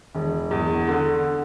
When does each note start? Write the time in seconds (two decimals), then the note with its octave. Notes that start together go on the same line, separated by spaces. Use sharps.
0.15 E1
0.51 E2
0.88 D3